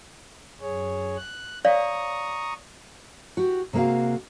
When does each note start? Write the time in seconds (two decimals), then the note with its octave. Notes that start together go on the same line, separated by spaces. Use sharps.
0.61 F#2 G#4 C#5
1.17 F#6
1.65 C#5 D5 F5 A#5 C#6 D#6
3.37 F#4 G4
3.73 C3 G#3 A#3 F#4 F5